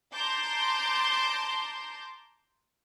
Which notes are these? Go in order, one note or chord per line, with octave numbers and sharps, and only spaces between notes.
A5 A#5 C6 D6 G6